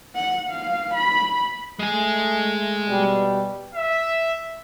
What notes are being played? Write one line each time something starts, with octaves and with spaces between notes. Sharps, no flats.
F#5
F5
B5
G#3 A3 G#4
B2 G3
E5